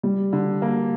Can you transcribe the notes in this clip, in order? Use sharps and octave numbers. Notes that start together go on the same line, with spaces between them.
G3
D3
A#3